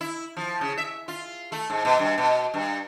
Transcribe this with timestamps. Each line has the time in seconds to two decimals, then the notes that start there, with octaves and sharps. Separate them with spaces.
0.01 E4
0.37 F3
0.61 C#3
0.77 E5
1.08 F4
1.52 A3
1.70 G#2
1.85 B2
1.99 G2
2.18 B2
2.54 G2